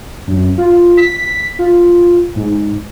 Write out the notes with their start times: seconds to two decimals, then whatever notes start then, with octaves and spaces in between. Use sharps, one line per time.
0.27 F#2
0.58 F4
0.97 B6
1.59 F4
2.36 G#2